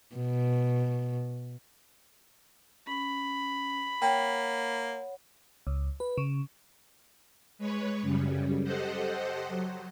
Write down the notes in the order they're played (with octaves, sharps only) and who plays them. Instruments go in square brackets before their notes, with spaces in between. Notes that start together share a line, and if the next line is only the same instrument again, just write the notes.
[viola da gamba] B2
[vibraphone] C#4 [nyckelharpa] B5
[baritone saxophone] A#3 [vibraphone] C#5 F#5 [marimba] G5
[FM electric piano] C#2
B4
C#3
[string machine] G#3 B4 C#5
F#2 C#3 G3
G4 A4 C5 D#5 F#5
F#3